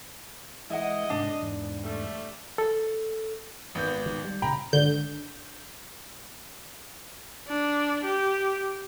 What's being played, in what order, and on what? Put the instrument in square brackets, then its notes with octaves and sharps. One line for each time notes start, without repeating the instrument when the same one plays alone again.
[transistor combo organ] E3 G#3 [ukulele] E4 F#5 [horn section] D#5
[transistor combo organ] G#2 C3 [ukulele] D4
[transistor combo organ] E2 G#2
[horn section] D3 G3 A3
[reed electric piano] A4
[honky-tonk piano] G#1 B3 G6
[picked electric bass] D#3
G3
[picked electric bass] A#2 C#3 [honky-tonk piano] G5 A#5 B5
[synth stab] G#1 D3 G6
[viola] D4
G4